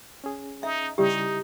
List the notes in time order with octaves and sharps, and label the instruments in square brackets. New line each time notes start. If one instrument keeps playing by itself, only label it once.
[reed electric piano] C#4 G#4
[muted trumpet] D#4 [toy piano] E5
[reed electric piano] C#3 G3 E4 [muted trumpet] D#4 [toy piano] G4